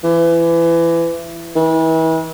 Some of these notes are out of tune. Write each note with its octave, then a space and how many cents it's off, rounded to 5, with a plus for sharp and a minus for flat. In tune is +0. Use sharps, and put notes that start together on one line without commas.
E3 +25
E3 -35